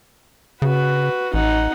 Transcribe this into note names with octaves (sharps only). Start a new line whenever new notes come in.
C#3 F#4 B4
A1 D#4 F#5